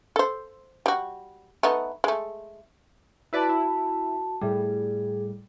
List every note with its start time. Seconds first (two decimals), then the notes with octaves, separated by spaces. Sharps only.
0.16 A4 C5
0.86 G3 F#4
1.63 A3 B3 D#4
2.04 G#3 A3
3.33 E4 F#4 B4 D5 A5
3.49 E4
4.42 A2 G3 G#4